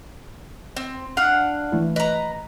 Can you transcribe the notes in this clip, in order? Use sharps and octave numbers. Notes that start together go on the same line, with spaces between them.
C4
D4 F5 F#5
E3 A3 E4
B4 D#5 A#5